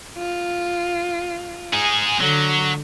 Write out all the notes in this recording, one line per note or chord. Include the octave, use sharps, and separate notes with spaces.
F4
D#4 G#4
D3 F#3